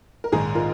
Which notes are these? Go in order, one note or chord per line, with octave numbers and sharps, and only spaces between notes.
A#4
A#1 G#2 D#3 D#4 G#4
F4 A#4